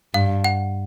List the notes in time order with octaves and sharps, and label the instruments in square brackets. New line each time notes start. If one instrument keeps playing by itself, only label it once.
[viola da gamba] G2 [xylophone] F5
[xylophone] F#5